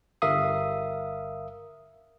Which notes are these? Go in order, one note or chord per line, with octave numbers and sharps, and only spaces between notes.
G1 A#4 E5 F5 D#6